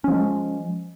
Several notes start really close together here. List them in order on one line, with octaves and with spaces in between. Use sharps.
C#4 F3 G#3